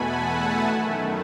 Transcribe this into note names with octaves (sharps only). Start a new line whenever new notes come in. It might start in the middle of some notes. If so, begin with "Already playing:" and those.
Already playing: E2 B2 A3 F#5 G#5 A5 B5
E5 G#5
F#2 D#3 A3